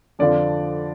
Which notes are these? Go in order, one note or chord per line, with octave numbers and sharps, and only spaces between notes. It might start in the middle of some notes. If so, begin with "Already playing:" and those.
F2 D3 F3 D5